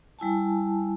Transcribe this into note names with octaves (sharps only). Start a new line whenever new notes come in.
G3 E4 G#5 A5